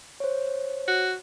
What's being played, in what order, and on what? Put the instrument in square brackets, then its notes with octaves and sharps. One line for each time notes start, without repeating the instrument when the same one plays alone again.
[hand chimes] C5 C#5
[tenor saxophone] F#4